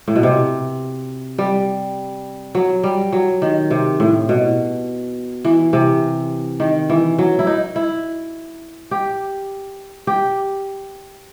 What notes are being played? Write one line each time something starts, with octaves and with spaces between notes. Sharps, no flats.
A2
B2
C3
G3
F#3
G3
F#3
D#3
C3
A2
B2
E3
C3
D#3
E3
F#3
E4
D#4
E4
G4
G4